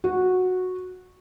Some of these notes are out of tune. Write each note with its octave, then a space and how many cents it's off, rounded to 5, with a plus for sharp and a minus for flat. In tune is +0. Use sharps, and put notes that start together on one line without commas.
F#4 -10